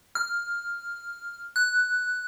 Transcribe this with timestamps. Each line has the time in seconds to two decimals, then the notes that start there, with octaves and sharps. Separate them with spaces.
0.15 F6
1.56 F#6